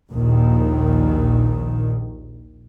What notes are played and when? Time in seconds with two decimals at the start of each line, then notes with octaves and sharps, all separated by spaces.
0.10 A#1 D#2 A#2 D#3